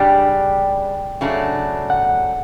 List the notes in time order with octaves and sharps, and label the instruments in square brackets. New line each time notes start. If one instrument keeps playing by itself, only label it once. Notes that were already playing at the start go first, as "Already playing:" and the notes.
Already playing: [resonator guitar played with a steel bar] C#3 G3 D4 G4 [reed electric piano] G5
[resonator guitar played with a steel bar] C#3 F#3 A3 D4
[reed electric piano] F#5